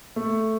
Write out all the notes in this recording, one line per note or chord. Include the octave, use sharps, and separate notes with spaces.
A3